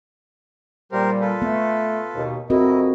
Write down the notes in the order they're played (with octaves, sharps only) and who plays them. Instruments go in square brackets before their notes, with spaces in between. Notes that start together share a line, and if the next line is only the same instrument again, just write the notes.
[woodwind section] A#2 G3 [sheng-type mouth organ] G4 A#4 C5
[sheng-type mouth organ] F4 A4 B4
[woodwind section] A3 [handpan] B3
[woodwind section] D#2 B2
[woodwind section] F2 D#5 [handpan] C4 F#4 A#4 [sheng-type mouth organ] E4